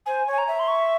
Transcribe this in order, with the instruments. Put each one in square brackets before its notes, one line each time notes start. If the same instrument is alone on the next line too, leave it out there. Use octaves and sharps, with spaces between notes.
[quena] C5 [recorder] G#5
[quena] C#5
[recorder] G#5
A#5
[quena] E5
[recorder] C6
C#6